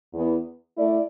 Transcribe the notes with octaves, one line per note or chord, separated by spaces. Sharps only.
E2 E3 B3
A3 E4 D5